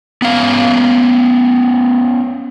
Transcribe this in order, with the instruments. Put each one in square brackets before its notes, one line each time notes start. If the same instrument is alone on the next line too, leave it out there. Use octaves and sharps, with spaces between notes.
[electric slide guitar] B3 C#4 F5